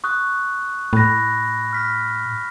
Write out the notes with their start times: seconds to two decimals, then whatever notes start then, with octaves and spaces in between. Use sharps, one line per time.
0.04 C#6 D#6 F#6
0.93 A2 B5 F#6 A#6
1.73 F6 B6